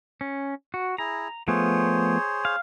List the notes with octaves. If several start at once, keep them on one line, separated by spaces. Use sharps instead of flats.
C#4
F#4
E4 G#4 A#5
F3 A3 B3 G#4 C5 C#5
F5